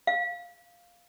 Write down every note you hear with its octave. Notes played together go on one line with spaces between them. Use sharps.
F5